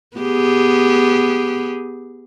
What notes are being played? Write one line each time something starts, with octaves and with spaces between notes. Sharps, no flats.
B3 G4 G#4